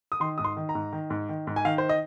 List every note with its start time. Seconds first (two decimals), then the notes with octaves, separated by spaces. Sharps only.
0.12 D#6
0.20 D#3 C6
0.38 G#2 D#6
0.44 C6
0.57 D#3
0.69 A#5
0.75 G#2
0.92 D#3
1.10 G#2
1.29 D#3
1.47 G#2
1.56 G#5
1.65 D#3 F5
1.78 C5
1.89 D#5